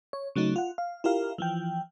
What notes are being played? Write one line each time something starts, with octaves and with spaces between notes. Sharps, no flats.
C#5
C#3 F#3 A3 D#4
F4 F#5
F5
E4 F4 G4 A#4 F5
E3 F3 G5